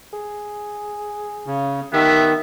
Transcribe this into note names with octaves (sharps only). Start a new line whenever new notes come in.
G#4
C#3
D#3 B3 G4 E5